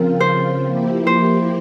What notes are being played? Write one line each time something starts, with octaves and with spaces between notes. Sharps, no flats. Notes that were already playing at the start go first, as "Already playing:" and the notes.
Already playing: C#3 F3 C4 F4 A#4
C5
F3 A#3 E4 G4
C5